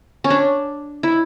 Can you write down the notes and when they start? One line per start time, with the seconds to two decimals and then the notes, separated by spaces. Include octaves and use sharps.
0.24 C#4
0.30 D4
1.03 E4